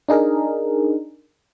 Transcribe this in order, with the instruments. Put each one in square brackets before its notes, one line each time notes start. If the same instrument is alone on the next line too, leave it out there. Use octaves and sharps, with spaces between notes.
[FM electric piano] D4 D#4 G#4 A#4